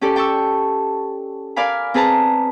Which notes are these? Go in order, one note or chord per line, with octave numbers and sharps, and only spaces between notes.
C#4 G4 A4 D5
G5 A5 C#6 E6
A#4 D5 F5 G#5 B5
C4 G#4 B4 A5 A#5